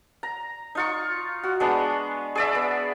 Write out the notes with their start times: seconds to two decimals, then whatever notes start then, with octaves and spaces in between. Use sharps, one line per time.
0.23 A#5
0.75 D#4 F4 C#6
1.44 F#4
1.60 G#3 B3 D4
2.35 G#4 D5 E5
2.55 B3